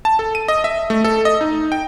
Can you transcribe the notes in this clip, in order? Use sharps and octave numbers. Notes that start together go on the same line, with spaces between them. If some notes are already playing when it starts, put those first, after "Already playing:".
A5
A4
D#7
D#5
E5
A3
A4
D#5
D#4
G5